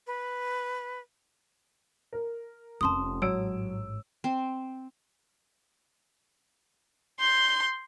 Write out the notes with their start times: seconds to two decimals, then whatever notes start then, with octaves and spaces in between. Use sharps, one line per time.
0.07 B4
2.13 A#4
2.81 F1 C#4 A5 C6 D#6
3.22 A1 G#2 F#3 C#5 E6 D7
4.24 C4
7.20 C6 G6